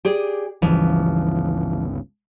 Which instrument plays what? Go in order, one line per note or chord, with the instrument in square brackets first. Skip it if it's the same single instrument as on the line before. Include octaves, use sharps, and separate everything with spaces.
[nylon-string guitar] G4 G#4 D5
[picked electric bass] G1 C#2 [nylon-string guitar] E3 F3